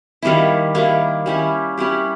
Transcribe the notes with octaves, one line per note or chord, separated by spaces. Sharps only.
D#3 G3 A#3 E4
D#3 G3 A#3 E4
G3 C#4 E4 G4
G3 C#4 E4 G4